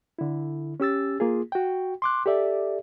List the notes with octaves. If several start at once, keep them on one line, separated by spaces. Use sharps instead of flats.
D3 E4
C#4 G4 E6 A6
A#3 F4 G#4
F#4 G5
C6 D6 F#6
G4 A4 D5 E5